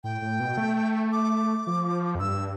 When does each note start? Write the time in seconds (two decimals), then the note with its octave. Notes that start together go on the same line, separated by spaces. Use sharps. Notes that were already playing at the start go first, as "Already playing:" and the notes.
0.04 A2 G5
0.22 A2
0.40 B2
0.57 A3
1.12 D6
1.67 F3
2.15 F2
2.20 G2 E6